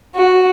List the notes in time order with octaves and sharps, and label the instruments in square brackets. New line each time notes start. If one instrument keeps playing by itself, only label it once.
[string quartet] F#4